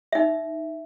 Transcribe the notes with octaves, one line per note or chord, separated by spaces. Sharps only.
D#4 E5